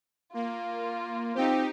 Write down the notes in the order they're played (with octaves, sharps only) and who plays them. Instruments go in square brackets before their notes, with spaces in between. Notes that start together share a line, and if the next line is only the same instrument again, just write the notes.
[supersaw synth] A#3 [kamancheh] F4
[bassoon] F3 [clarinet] C4 [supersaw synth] D#4 G4